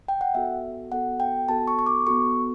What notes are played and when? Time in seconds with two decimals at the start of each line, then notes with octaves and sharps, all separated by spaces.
0.08 G5
0.21 F#5
0.34 B3 F#4 A4 E5
0.92 B3 F#4 A4 F#5
1.20 G5
1.49 B3 F#4 A4 A5
1.68 C#6
1.79 C#6
1.86 D6
2.07 B3 F#4 A4 C#6